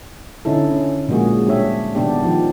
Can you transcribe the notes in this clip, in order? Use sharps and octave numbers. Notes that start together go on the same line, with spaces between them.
D3 C#4 D#4 E4 A4
C#4
A#2 F3 G#3 A#3 F#4 G#4
G3 D4 G4 C#5 E5
D#3 B3 D4 G4
D#3 F3 G4